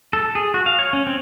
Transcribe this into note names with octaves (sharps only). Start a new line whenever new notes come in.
A4
G#4
F#4
F5
C#5
C#4
C4